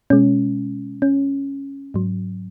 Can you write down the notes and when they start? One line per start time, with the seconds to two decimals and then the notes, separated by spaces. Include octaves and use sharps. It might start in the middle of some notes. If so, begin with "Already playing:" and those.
0.10 B2 G#3 C#4
1.02 C#4
1.94 G#2 F#3